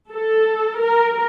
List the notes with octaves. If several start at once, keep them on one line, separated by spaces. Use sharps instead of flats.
A4
A#4